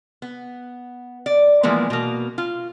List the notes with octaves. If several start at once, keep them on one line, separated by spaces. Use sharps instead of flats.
B3
D5
E3 F3 G#3 A#3 B3
B2 A#3
F4